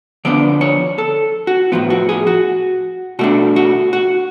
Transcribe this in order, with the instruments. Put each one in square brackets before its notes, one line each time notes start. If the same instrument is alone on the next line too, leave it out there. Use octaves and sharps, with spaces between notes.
[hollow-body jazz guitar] D3 F3 B3 D4 D5
C#5
A4
F#4
A2 F3 B3 F4
F#4
G#4
F#4
B2 A3 D4 F#4
F#4
F#4